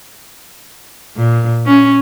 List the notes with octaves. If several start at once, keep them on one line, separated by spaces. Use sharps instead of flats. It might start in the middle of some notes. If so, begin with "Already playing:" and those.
A#2
C#4